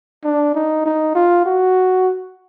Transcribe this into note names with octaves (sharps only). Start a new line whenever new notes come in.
D4
D#4
D#4
F4
F#4